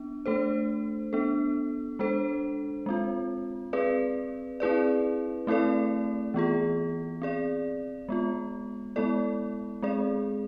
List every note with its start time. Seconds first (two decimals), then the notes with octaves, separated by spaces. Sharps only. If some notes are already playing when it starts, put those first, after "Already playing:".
Already playing: B3 D4
0.26 A3 D4 A4 C5
1.13 B3 D4 A4
1.99 G#3 D4 A4 C5
2.86 G#3 C4 F4
3.73 C4 G#4 B4 D5
4.60 C4 E4 G#4 B4 D5
5.47 A3 C4 E4 A4 D5
6.34 E3 B3 F4 G#4
7.22 C4 G#4 D5
8.09 G#3 B3 F4
8.96 G#3 B3 E4 A4 D5
9.83 G#3 C4 G#4 D5